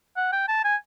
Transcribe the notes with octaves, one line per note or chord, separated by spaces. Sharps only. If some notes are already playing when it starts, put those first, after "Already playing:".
F#5
G5
A5
G#5